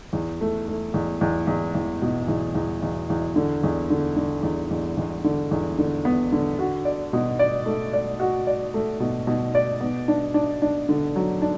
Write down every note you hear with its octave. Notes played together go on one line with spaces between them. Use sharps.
E2
A3
A3
E2
E2
E2
E2
B2
E2
E2
E2
E2
D3
E2
D3
D3
E2
E2
E2
D3
E2
D3
B3
D3
F#4
D5
B2
D5
A3
D5
F#4
D5
A3
B2
B2
D5
B3
D4
D4
D4
D3
F#3
D4